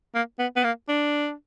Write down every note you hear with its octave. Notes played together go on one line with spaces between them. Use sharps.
A#3
B3
B3
A#3
D4